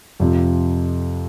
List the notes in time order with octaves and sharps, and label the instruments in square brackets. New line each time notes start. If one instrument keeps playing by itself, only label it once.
[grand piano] F2 C3 F3